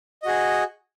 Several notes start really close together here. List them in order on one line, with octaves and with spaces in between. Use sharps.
D#5 F#4 G#4